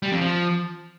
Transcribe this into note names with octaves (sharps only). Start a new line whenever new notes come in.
G3
F2
F3